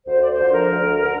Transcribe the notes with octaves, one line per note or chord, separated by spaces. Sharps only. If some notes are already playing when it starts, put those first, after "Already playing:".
D2 C5
D5
C5
D3 F3
A#4
D2
D3